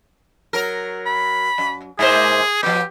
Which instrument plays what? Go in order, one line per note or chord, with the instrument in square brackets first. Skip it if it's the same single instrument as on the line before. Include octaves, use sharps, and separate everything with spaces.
[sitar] F#3 A#4
[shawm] B5
[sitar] F#2
[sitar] G#2 A#3 C5 [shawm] G#4
[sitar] F3 B3 [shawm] G4